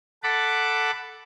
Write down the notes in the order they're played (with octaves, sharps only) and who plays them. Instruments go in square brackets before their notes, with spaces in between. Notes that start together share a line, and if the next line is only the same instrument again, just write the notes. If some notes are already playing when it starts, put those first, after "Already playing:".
[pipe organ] A4 F#5 A5 B5 D6